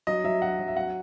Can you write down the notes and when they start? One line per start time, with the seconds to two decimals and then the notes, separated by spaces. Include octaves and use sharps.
0.07 F#3 D#5
0.24 F#3 E5
0.42 F#3 F#5
0.59 F#3
0.68 E5
0.75 F#3 F#5